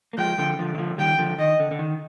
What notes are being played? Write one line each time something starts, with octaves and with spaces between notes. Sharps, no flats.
A#3
F3 G#3 G5
D3 F3
D3 F3
D#3
D3 F3
D#3 G3 G5
D3 F3
D#3 D#5
D3
D3
D#3